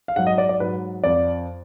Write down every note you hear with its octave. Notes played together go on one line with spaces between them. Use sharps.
F5
G#2 F#3 F#5
D#5
D5
D5
G#2 F#3 B4
F2 F3 D5